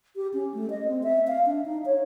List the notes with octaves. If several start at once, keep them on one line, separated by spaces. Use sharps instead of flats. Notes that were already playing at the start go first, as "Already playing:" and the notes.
G4
C#4
A3
D#5
C4
E5
F5
D4
D#4
C#5